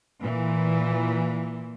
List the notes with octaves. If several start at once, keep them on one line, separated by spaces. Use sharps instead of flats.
A#2 E3